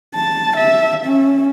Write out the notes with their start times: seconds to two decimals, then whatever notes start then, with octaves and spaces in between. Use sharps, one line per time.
0.15 A5
0.57 E5
1.06 C#4